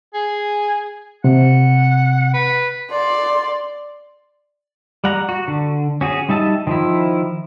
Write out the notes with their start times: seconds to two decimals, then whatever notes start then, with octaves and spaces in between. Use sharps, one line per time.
0.14 G#4
1.24 C3 F#5
2.34 B4
2.91 D5 C6
5.04 G3 F#5 A#5
5.29 F#4
5.48 D3
6.01 C#4 F#4 G#4
6.29 G3 D#4 E5 A5
6.67 D#3 F3 E4